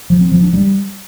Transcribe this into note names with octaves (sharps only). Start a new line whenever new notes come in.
F3
C4
F3
D4
G3